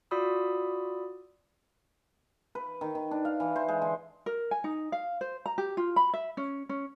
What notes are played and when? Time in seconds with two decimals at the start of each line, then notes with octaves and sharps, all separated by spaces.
0.11 F4 F#4 D5 B5 D#6 E6
2.55 B4
2.81 D#3
2.95 D#3
3.11 D4
3.25 F5
3.40 E3
3.56 C5
3.69 G#3
3.82 D3
4.26 A#4
4.51 G#5
4.64 D#4
4.92 F5
5.21 C5
5.46 A#5
5.58 G4
5.77 F4
5.96 B5
6.14 E5
6.37 C#4
6.69 C#4